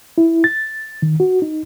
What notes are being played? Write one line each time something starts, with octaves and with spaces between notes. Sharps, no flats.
E4
A6
D#3
F#4
D#4